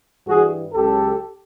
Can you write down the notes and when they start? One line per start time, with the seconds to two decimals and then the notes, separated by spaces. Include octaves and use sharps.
0.27 G2 E3 G3 F#4 G#4
0.73 C#2 C#3 F#3 G4 A4